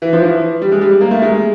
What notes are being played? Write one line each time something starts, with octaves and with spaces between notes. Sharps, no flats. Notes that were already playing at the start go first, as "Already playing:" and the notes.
E3
F3
E3
G3
G#3
G3
A#3
A3
G#3